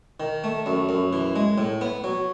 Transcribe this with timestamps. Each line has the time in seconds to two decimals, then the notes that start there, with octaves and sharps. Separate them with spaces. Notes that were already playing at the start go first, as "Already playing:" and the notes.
0.20 D#3
0.44 A3
0.66 F#2
0.89 F#2
1.13 E3
1.36 G#3
1.58 A2
1.81 B3
2.04 F#3